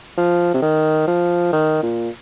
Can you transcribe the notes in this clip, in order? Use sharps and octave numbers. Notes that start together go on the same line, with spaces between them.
F3
C3
D#3
F3
D#3
A#2